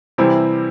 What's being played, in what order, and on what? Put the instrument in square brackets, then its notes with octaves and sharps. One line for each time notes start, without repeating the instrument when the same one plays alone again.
[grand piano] C3 E3 G3 C4 E4